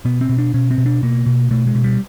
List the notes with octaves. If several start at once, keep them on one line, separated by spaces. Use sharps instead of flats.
B2 B3
C4
B2
D4
B2 C#4
C4
B2
D4
B2 A#3
B2
B2 A3
G#3
B2
G3